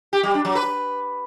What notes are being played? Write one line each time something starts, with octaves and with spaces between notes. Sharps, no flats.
G4
G3
D4
F#3
B4